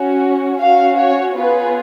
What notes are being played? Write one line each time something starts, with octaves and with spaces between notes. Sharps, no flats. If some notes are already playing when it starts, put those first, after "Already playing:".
Already playing: C#4 F#4
C#4 F#4 F5
C#5
B3 F4 G#4 B4